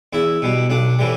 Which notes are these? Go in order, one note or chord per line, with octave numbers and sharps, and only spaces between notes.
E2 E4
B2 G3
B1 D4
A2 E3 G3